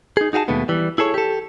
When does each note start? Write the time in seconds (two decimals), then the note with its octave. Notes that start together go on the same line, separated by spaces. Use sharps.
0.17 D#4 G#4
0.33 D#4 F#4 G#4 F5 A5
0.48 D#2 B2 G#3 A3 B3
0.69 E3 G3
0.98 E4 G#4 A4 C#5
1.14 G4 A4